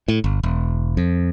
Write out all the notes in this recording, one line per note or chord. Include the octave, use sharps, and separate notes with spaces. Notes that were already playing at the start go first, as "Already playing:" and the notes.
A2
G1
E1
F2